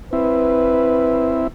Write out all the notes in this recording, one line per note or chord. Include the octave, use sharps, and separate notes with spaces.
C4 E4 B4